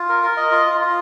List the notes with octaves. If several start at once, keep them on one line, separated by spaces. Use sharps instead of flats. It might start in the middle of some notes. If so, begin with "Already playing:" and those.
Already playing: F4
A#4
A#4
D#5
F4
F4
F4